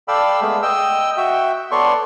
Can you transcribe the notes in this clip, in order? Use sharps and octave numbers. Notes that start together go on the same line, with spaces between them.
A4 D5 F5 G5 B5 E6
G#3 A3 B3 G#4
D#5 G5 E6
F#4 E5 G5
B3 A4 C#5 D5 C6 C#6